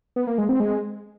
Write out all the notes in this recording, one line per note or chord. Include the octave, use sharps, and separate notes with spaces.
B3
A#3
G#3
C4
G#3